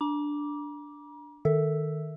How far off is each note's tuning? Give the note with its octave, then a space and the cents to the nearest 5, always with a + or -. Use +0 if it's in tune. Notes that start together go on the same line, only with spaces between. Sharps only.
D4 +0 A#5 +40 D6 -5
D#3 -10 A4 +0 E5 +0